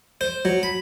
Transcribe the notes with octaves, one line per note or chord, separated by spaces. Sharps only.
C5
F#3
B5